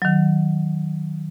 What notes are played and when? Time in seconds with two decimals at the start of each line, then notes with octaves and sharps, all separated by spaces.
0.02 D#3 F#3